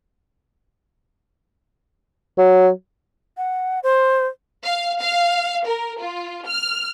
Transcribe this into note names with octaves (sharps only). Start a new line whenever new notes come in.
F#3
F#5
C5
F5
F5
A#4
F4
F6